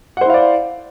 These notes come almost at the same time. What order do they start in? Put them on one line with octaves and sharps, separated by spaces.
F#5 C5 E4 F5 D5